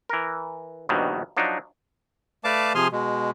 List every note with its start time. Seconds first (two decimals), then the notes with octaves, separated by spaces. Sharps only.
0.09 E3 A#4
0.89 A#1 G2 B2 D#3 F#3 G3
1.37 F3 F#3 D4 D#4
2.44 A3 B4 D5 F5 A5 D6
2.75 C3 F3 G#4 G#5 C6 F6
2.92 B2 G#3